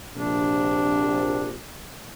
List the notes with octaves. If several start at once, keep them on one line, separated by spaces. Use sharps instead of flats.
A#1 C3 D4